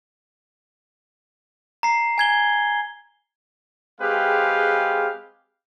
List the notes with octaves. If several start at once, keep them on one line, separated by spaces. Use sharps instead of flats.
A#5 C7
G#5 G#6 G7
G#3 C4 G4 G#4 B4 F5